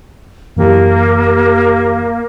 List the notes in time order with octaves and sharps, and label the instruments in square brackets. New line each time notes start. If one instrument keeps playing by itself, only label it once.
[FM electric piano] F#2 E3 G4 [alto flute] A#3